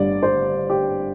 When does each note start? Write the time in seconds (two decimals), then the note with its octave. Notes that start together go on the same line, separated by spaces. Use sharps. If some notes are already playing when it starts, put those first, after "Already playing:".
Already playing: G1 G2 D3 G3 D5
0.23 C5
0.70 G4